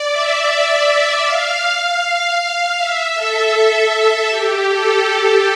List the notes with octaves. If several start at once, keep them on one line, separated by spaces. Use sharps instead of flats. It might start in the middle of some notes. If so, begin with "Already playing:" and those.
Already playing: D5
E5
E5
F5
F5
E5
A4
G4
A4
A4